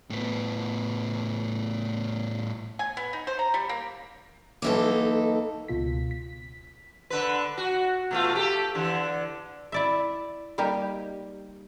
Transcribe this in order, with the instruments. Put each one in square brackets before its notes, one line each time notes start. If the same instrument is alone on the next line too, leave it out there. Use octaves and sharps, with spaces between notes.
[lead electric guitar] A2 B3
[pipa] G#5
B3
D#4
C5
A#5
G3
A#3
[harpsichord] B1 E3 D6 [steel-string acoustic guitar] A#3 D#4 A4
[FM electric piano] C#2 B2 F4 B6
B6
[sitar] D3 B4
F#4
B2 A3 F4
G4 A4
D3 E3
[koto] E4 D5 E5
G3 A#3 D#4 G4